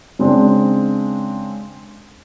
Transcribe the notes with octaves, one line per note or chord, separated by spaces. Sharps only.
C#3 G#3 C4 D4